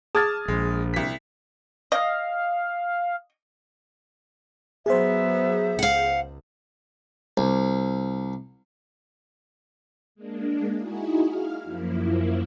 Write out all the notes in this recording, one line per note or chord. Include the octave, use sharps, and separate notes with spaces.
G#4 A5 D#6 F6 G#6 A6
A#1 G#3
C2 B6
D#5 F5
F#3 B3 G#4 C5 E5
C#2 F5 F#5
C2
G#3 A#3 D4
D#4 E4 F#4 G#4
F5 F6
F#2 F3 A#3 E4